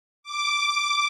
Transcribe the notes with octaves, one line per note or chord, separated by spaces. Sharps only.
D6